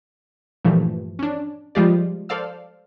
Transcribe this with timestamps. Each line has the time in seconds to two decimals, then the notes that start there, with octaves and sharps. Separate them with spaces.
0.65 G2 A#2 E3 F3 A3
1.19 C#4 D4
1.75 F3 G3 G#3 F4 G4 D5
2.29 A4 C5 D5 F5 E6